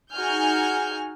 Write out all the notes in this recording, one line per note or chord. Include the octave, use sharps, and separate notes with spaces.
D#4 F#4 G#4 G#5 F6 G6